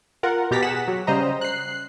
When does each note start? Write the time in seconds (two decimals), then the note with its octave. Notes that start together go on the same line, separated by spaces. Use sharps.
0.23 F4 A#4 F#5
0.51 B2 G4 A#5 A6 B6
0.62 G#4 F#5 B6 E7
0.88 F#3
1.07 C#3 G3 C5 D#5 A#5
1.41 F#6 C7